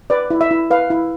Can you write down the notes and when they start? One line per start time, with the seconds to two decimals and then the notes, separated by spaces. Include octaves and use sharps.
0.10 B4 D5
0.30 E4
0.41 E5
0.51 E4
0.71 B4 F5
0.90 E4